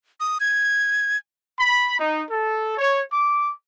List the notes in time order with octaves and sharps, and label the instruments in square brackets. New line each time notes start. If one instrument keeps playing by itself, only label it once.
[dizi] D#6
G#6
[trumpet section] B5
D#4
A4
C#5
D6